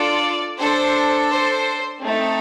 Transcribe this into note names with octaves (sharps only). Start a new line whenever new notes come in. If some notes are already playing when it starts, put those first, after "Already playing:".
Already playing: D4 F4 A4 D5
D4 A4 C5
C5
A3 C4 D#4 A4